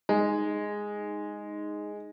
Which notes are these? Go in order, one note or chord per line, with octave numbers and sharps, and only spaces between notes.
G#3 D#4